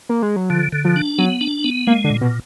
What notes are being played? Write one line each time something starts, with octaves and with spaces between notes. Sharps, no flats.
A#3
G#3
F#3
D3 F3
D3
F3
D4
F#3 B3
D4
B3
G#3 A#3
D3
A#2
B2